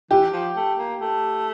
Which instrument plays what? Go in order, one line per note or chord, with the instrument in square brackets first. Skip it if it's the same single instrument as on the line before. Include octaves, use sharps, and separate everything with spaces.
[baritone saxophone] E3 [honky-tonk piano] G4
[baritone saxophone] F3
A3
A#3
A3